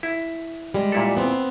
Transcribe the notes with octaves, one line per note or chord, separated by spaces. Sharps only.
E4
G3 G#3
A#2 E4 A4
B3 C4